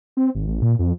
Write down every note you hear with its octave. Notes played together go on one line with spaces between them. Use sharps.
C4
G#1
A1
A#2
F2